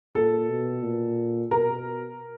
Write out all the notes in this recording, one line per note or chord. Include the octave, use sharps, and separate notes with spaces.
A#2 A4
B2
A#2
B2 A#4